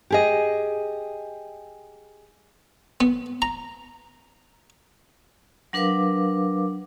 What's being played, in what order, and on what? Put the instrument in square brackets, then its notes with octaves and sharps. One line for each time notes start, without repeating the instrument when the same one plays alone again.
[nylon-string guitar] G4 G#4 D#5
[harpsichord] B3
A#5
[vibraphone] F#3 D4 A#4 B4 F5 D6